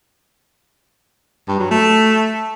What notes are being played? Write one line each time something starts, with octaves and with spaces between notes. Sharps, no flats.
G2
F#3
A3